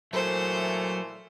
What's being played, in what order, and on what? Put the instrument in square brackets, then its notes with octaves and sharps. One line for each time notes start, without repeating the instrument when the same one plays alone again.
[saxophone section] A#2 E3 A3 [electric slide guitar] F#3 [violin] C5